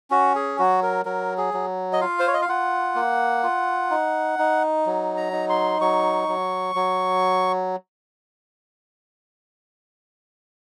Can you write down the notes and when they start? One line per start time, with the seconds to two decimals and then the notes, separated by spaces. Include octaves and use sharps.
0.10 C#4 F#4
0.35 G#4
0.59 F#3 F#4
0.83 A#4
1.05 F#3 A#4
1.38 G#4
1.54 F#3
1.93 D#5
2.01 F4 F5
2.20 C5
2.27 C#5
2.34 D#5
2.42 F5
2.49 F4 F#5
2.95 A#3
3.43 F4
3.91 D#4
4.39 D#4
4.86 F#3
5.17 A#5
5.33 D#4
5.50 C6
5.81 F#3 C#6
6.28 F#3
6.75 F#3